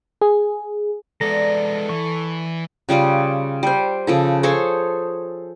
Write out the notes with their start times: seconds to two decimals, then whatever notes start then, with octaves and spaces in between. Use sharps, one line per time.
0.21 G#4
1.21 G#3 B3 A4 D5 A#5
1.89 E3 C#6
2.89 C#3 G3 F4 D5
3.63 G3 C5
4.07 C#3 F3 A4
4.43 G#4 A4 C5 C#5